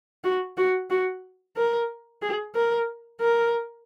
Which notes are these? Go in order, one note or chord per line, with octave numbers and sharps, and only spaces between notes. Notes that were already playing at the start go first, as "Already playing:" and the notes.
F#4
F#4
F#4
A#4
G#4
A#4
A#4